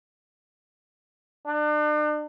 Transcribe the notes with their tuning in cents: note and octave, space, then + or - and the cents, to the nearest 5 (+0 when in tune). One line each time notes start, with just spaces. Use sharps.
D4 +40